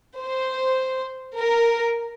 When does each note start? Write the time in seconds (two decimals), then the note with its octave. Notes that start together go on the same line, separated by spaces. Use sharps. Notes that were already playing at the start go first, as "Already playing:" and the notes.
0.21 C5
1.38 A#4